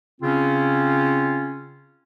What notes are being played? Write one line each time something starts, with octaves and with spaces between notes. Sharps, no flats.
C#3 C4 C#4 F4